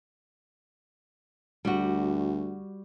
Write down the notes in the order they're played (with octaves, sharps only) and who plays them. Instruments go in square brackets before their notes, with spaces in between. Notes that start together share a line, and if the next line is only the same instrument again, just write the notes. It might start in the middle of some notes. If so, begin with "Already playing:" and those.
[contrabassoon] D2 [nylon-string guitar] G3 F#4